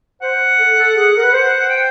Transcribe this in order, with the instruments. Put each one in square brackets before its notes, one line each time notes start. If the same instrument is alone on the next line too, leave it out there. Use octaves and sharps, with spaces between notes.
[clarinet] C5 [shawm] F#5
[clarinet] A4
A4
G#4
A#4
B4
C5
[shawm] G5